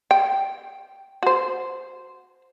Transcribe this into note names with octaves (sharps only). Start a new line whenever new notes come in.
G5
F#4 C5